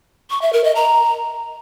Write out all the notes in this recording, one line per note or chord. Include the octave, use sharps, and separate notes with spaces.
C#6
E5
A#4
D#5
A#5